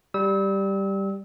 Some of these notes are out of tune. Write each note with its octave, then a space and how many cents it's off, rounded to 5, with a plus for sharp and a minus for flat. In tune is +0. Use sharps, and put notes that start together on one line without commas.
G3 +0 E6 -35